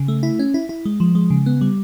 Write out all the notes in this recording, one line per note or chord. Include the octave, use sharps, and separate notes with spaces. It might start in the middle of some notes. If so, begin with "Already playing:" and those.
Already playing: C#3
A3
E4
C#4
E4
E4
G#3
F3
G#3
C#3
B3
G3